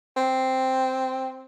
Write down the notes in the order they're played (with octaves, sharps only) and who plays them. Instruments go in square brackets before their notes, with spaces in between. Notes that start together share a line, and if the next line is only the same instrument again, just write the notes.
[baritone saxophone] C4